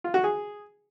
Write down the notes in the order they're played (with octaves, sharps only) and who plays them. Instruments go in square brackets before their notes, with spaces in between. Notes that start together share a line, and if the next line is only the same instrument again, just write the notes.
[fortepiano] F4
F#4
G#4